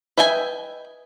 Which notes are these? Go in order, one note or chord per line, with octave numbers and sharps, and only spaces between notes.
B4 D#5 E5 G5 G#5